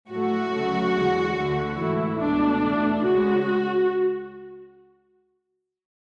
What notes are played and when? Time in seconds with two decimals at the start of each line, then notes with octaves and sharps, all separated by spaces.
0.11 A2 F#3 A3 F#4
0.53 D2 C#3 F#3 A3
0.95 E2 D3 G#3
1.37 D2 D3 A3
1.78 G#2 E3 A3 E4
2.20 C#2 B2 A3 D4
2.62 E2 B2 A3
3.04 C#2 C#3 G#3 F#4